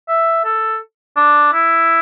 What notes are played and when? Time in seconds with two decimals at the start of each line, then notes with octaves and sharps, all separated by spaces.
0.08 E5
0.45 A4
1.17 D4
1.53 E4